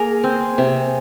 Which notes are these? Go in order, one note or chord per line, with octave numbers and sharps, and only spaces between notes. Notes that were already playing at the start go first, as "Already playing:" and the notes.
Already playing: A#3 G#4 A#4
C4
C3